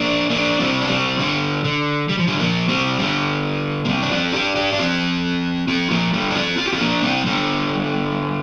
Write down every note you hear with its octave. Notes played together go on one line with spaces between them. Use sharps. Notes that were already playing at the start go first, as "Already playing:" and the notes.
Already playing: A#3 D4
A#3 D4
G3 C4
D4
G3 C4
D3 G3
D3
G3
F3
D3 G3
F3 A#3
G3 C4
D3 G3
A#3
G3 C4
D4
C4 F4
D4 G4
D4 G4
D4
C4 F4
C4 F4
F3 A#3
D3 G3
D4
C4 F4
F4
G4
C4 F4
A#3 D4
G3 C4
D3 G3